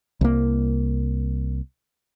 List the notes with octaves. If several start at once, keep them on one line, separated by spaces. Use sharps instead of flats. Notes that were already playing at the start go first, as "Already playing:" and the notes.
C2 A#3